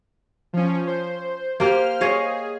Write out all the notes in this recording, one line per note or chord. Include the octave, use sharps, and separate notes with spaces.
F3 C#4
C5
A#3 G4 C5 F6
G#4 C#5 D#5 F5